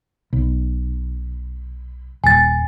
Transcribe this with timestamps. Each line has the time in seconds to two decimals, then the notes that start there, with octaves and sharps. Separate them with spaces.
0.33 B1
2.24 D#1 G#5 A6